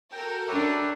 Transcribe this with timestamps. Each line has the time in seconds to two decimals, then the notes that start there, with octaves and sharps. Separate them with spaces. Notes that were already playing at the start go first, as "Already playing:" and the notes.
0.12 F#4 A4 A#4 G5
0.48 D4 G4 B4 C#5 E5